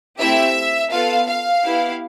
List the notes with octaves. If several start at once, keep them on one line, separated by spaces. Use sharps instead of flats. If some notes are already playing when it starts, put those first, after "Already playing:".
A3 C4 E4 G4 E5
B3 F4 A4 F5
F5
B3 E4 G4